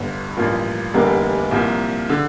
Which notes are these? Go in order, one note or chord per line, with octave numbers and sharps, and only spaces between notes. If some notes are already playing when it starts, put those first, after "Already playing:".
Already playing: G1 G2 D3
A1 G2 F3 A#3 F4
F1 E2 D3 G3 A#3
C2 A#2 F3
D3